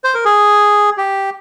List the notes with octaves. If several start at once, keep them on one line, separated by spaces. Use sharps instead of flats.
C5
A#4
G#4
G4